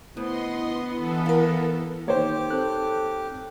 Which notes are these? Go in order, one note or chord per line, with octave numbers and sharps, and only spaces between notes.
D2 B3 E4 D#5 C6
E3 E4 A4
E4 A#4 F5
D#3 A#3 G4 C5 C#5 D6
C4 A4 F#6